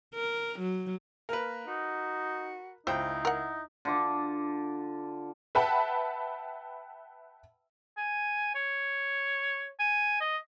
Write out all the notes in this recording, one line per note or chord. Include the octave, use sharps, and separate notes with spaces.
A#4
F#3
A#3 A#4 B4
D#4 F#4
C#2 D#4 E4 C5 G5
A#4 F#5
D3 F4 D6
B4 E5 F#5 G5 A5 B5
G#5
C#5
G#5
D#5